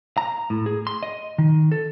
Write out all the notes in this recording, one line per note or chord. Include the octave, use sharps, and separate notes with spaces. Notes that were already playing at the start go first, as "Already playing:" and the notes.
A#5
A2
G#4
C6
D#5
D#3
A4